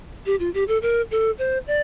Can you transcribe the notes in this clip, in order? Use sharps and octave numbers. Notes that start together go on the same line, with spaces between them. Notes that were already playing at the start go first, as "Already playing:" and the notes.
G4
F4
G4
A4
A#4
A4
C5
D5